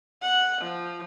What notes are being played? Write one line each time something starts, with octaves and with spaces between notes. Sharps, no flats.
F#5
F3